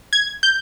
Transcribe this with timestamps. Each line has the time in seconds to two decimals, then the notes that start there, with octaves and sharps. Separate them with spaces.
0.13 G#6
0.43 G6